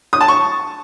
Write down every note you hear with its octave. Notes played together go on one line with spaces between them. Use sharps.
D#6
A5
C#6